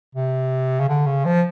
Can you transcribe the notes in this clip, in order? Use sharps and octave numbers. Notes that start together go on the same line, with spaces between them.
C3
C#3
D3
C#3
F3